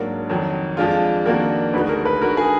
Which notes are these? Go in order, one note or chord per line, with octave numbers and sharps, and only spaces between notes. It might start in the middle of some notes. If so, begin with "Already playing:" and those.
Already playing: G#2 F#3 A#3 D4 A#4
F2 D#3 F#3
F2 F3 G#3 D4 F4
F2 D#3 A#3 D4 F#4 A#4
D2 D3 G#3 D#4 F#4 B4
A#4
B4
D3 G#3 D#4 F#4 A#4
G#4